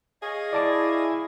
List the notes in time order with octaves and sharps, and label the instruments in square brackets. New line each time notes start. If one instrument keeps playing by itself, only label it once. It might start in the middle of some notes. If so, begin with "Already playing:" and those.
[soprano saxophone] G#4 [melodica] C#5 D#5 F5
[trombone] E4 [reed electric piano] D5 A5 D6